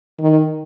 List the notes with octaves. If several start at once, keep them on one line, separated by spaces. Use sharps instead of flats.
D#3